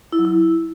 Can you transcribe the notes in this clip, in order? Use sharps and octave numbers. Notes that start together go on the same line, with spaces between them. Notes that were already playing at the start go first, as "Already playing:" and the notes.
E4
F#3
E4